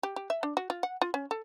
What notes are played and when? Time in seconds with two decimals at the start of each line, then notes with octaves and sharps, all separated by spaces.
0.03 G4
0.16 G4
0.30 E5
0.43 D4
0.57 F#4
0.70 F4
0.83 F#5
1.02 F4
1.14 C#4
1.31 A4